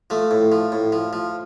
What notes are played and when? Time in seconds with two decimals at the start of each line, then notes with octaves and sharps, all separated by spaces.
0.10 F3 A3
0.31 A2
0.52 F3
0.72 A2
0.92 F3
1.13 F3